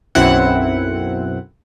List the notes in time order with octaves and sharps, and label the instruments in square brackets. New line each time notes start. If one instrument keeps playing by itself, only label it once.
[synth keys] B1 F#2 C4 E4 F#5